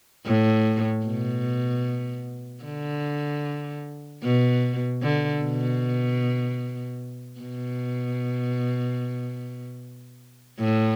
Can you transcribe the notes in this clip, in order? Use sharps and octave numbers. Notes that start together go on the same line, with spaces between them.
A2
B2
D3
B2
D3
B2
B2
A2